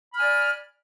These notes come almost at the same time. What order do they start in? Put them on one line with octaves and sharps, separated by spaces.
B5 F6 G#5 D5